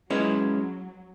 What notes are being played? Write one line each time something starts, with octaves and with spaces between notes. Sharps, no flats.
F#3 G#3 C#4 E4 B4